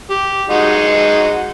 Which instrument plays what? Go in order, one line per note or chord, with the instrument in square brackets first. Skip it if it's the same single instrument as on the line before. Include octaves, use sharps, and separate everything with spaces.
[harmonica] G4
G#3 D#4 F#4